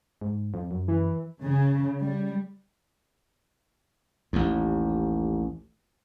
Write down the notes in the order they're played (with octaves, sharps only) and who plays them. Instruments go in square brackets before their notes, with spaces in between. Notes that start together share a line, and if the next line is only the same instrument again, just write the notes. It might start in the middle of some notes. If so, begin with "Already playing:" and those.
[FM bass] G#2
F2
F#2
[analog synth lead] E3
[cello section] C#3
G3
[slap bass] A1 D#2